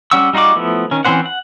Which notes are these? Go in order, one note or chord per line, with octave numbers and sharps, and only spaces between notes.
G3 C#4 F#5 C#6 E6
G3 D#4 F4 F#4 D6
F3 A3 B3 E4
D#3 C#4
E3 C4 C#4 C5 F#5
F#5